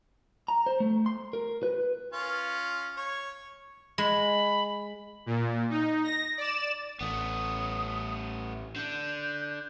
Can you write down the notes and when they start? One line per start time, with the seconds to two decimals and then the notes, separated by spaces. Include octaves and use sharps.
0.48 A#5
0.66 C5
0.80 A3
1.06 C6
1.33 A#4
1.63 B4
2.13 C#4 F4
2.97 C#5
3.98 G#3 B5
5.26 A#2
5.70 D#4
6.04 A#6
6.37 D5 E7
7.01 A1 A3 B3 D#6
8.76 D3 D4 G6